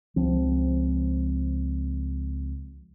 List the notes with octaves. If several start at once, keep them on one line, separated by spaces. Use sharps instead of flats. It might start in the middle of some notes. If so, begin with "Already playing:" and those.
C#2 F3 C4